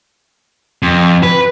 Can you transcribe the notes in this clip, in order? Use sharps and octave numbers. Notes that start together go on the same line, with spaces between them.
F2
B4